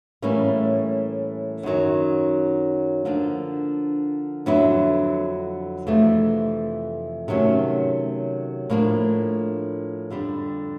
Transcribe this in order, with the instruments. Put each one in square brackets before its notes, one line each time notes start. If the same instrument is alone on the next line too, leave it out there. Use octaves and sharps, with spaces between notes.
[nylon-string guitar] A2 E3 G3 A#3 C#4
F#2 D#3 F#3
D3 F3 A#3 D4
F2 D3 F#3 B3 E4
F2 C3 E3 A3
C3 D#3 F#3 A3 C#4
A2 F3 A#3 D4
F2 D3 G3